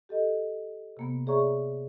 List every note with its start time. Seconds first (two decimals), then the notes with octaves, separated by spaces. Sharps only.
0.09 G4 A4 D#5
0.97 C3 A#3 B3
1.27 G#4 C#5 D5 E5 A#5 C#6